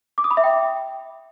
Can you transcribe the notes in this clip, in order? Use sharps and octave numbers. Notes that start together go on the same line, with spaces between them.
D6
D#6
B5
E5
G5